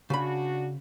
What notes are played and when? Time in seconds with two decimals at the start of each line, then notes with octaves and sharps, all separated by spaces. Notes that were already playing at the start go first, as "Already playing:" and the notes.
0.10 C#3 D4 F#4 B5